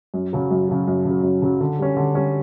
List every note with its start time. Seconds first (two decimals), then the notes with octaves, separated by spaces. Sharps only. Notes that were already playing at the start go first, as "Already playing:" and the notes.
0.14 F#2
0.33 C#3 F#3
0.51 F#2
0.69 C#3 F#3
0.87 F#2
1.05 C#3
1.10 F#3
1.23 F#2
1.42 C#3 F#3
1.60 D3
1.79 G3 C#4
1.97 D3
2.15 G3 C#4